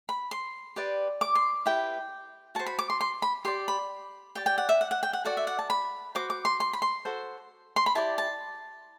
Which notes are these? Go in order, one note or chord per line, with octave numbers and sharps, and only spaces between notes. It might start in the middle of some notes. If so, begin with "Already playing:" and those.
B5
C6
G4 B4 D5
D6
C6
E4 G4 B4 G5
F#4 C5 A5
B5
D6
C6
C6
B5
G4 D5 C6
B5
G4 D5 G5
G5
F#5
E5
F#5
F#5
G5
F#5
F#4 A4 D5 F#5
E5
F#5
A5
B5
F#4 C5 D6
D6
C6
C6
B5
C6
F#4 A4 C5
C6
B5
E4 G4 D5 A5
A5